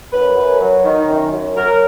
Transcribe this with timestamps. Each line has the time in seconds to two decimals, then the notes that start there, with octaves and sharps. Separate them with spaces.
0.13 F#2 B4
0.36 F#2
0.60 F#3
0.84 D#3
1.08 F#2
1.32 F#2
1.56 F#3 A#4